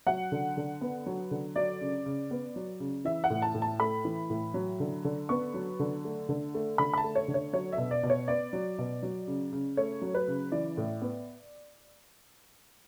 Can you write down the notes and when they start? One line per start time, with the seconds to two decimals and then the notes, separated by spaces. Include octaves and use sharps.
0.06 F#3 F#5
0.32 D3
0.57 D3
0.81 B3
1.06 F#3
1.31 D3
1.56 F#3 D5
1.81 C#3
2.06 C#3
2.31 B3
2.56 F#3
2.80 C#3
3.05 E3 E5
3.24 F#5
3.30 A2
3.42 A5
3.54 A2
3.62 A5
3.80 A3 B5
4.05 E3
4.30 A2
4.54 F#3
4.80 D3
5.04 D3
5.29 B3 C#6
5.54 F#3
5.79 D3
6.04 A3
6.29 D3
6.54 A3
6.78 D3 B5
6.94 B5
6.97 A5
7.04 A3
7.15 C#5
7.28 D3
7.34 C#5
7.53 F#3 C#5
7.72 E5
7.78 B2
7.91 D5
8.03 B2
8.10 C#5
8.28 B3 D5
8.53 F#3
8.78 B2
9.03 F#3
9.27 C#3
9.52 C#3
9.77 A3 C#5
10.02 F#3
10.14 B4
10.28 C#3
10.52 E3 D5
10.77 A2
11.02 B3